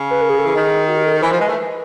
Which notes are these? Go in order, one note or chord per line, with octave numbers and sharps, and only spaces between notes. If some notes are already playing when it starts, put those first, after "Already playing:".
Already playing: C#3
B4
A#4
G#4
A4
E3 G#4
D#3
F#4
G4
A4
A#4
E3 C5
F3
G#3 B4
A3